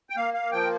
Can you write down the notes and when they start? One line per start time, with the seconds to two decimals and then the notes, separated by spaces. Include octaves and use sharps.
0.10 G5
0.17 A#3 F5
0.34 F5
0.52 F3 G5